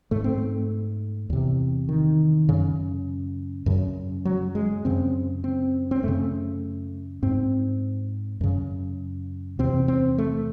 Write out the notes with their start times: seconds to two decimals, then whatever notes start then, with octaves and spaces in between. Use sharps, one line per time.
0.11 G#2 A3
0.24 C4
0.38 A3
1.30 E2 C3
1.89 D#3
2.49 F#2 C#3
3.66 F#2 C#3
4.25 F#3
4.55 G#3
4.85 F#2 C#3 C4
5.44 C4
5.91 C4
6.03 F#2 C#3 A3
7.23 G#2 C4
8.41 F#2 C#3
9.59 E2 C3 C4
9.88 C4
10.18 A3